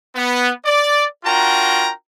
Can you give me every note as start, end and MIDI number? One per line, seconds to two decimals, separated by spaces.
0.16 0.51 59
0.65 1.04 74
1.24 1.90 62
1.24 1.90 65
1.24 1.90 66
1.24 1.90 70
1.24 1.90 79
1.24 1.90 82